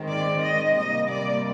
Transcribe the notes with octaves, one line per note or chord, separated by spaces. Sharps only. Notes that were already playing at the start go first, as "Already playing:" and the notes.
Already playing: D#3 G#3 C4
D5
D#5
C3 G3 A#3 D#5
D5